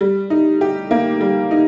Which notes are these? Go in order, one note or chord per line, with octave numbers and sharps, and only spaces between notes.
G3
D#4
G4
A#3
G3
D#4